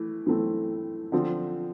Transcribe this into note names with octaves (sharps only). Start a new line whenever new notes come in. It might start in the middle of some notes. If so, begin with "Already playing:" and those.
Already playing: E3 A3
E3 A3 C4
D3 F3 C4